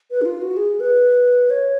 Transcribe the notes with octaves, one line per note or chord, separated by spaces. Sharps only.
B4
D4
F4
F#4
G#4
B4
C#5